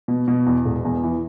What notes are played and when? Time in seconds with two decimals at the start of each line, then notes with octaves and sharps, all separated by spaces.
0.08 B2
0.28 B2
0.46 E2
0.65 E1
0.85 E2
1.03 E3